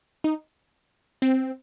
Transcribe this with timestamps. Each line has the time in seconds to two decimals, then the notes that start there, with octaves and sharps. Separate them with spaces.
0.24 D#4
1.22 C4